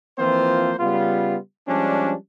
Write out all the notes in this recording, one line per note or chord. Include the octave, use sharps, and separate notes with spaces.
E3 F3 A#3 C4 F4 C5
C#3 G3 B3 F4
F3 G3 G#3 C#4 D4